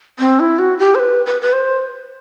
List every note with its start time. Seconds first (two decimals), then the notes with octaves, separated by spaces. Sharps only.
0.19 C4
0.40 E4
0.59 F#4
0.79 G4
0.95 C5
0.99 B4
1.26 B4
1.42 B4
1.53 C5